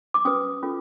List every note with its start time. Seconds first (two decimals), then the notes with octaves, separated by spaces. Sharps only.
0.14 D6
0.25 C#4 F#4 B4 D#6
0.63 C#4 F4 A4